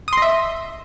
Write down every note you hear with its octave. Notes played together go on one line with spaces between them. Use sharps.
D#5 E5 C6 D#6